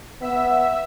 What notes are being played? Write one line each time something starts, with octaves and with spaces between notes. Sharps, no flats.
B3 E5 E6